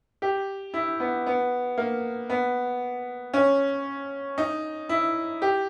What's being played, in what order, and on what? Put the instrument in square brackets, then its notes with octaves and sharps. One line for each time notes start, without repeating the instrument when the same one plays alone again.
[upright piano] G4
E4
B3
B3
A#3
B3
C#4
D#4
E4
G4